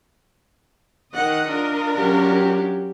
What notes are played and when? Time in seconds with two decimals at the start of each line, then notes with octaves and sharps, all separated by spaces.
1.14 D#3 D#5 F#5
1.47 D4 F4 A#4
1.97 F#3 C#4 G4